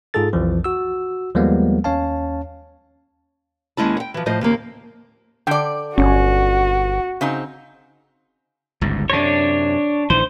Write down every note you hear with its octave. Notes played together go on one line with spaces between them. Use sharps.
G#2 F4 G#4 A4 A6
B1 F2 E3 F3
F#4 E6
D#2 F3 G3 G#3 A#3 B3
D#2 C#4 C#5 F5 A5
D#2 G#3 C#4 E4 A5
F#5 G5
E3 F3
A2 F3 F4 C5 D#5
D#2 C#3 A#3 C4
D3 D5 G5
G1 C#4 F#4
C#3 C4 D#4
G1 C#2 G#2
F#2 C3 D4 C#5
A#1 D#3 E3 C5